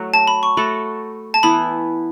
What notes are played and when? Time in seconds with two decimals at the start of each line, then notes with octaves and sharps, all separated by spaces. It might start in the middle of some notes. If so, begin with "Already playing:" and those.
Already playing: F#3 A3 F#4
0.14 A5
0.28 B5
0.43 C#6
0.57 A3 F#4 A4 B5
1.34 A5
1.43 E3 B3 E4 B5